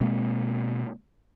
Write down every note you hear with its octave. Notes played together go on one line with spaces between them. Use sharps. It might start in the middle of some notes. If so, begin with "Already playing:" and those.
B2 G#3 A#3 C4